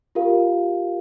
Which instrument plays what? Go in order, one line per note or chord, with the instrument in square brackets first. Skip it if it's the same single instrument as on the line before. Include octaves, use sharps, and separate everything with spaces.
[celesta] F4 G4 A#4 F5